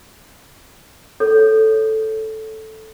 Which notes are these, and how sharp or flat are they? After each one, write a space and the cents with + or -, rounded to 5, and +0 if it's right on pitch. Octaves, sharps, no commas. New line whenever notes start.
A4 -5 C#5 +0